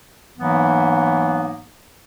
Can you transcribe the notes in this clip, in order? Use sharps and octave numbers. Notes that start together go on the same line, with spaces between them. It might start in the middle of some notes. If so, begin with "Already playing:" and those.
G#2 E3 F#3 A#3 B3